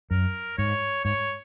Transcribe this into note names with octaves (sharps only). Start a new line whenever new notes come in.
F#2 A#4
G#2 C#5
G#2 C#5